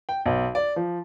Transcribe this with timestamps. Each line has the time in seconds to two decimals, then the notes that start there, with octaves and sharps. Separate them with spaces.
0.09 G5
0.26 B1
0.55 D5
0.76 F3